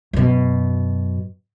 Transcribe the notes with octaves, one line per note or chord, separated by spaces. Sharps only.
F#2 B2